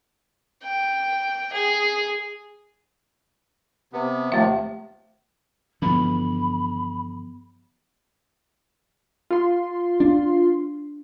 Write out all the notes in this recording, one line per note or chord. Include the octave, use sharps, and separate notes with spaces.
G5
G#4
C3 B3
D#2 C3 F3 A3 E5
G2 D3 E3 F3 B3 B5
F4 C6
D4